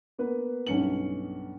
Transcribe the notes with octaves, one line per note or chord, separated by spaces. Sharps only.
A#3 B3 B4
B1 G2 C#4 C#7 F#7